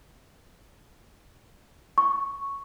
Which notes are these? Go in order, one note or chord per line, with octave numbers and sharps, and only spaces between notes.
C#6